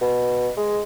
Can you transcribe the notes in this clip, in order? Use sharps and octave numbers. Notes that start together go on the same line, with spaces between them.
B2
G#3